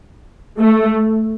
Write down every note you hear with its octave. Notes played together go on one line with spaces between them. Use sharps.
A3